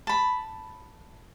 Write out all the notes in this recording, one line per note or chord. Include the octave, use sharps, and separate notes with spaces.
A5 B5